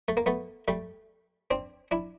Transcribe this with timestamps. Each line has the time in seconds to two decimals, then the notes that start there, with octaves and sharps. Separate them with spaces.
0.08 A3
0.17 A#3
0.26 A3 B3
0.68 G3 A3
1.51 C4 D4
1.91 D4 E4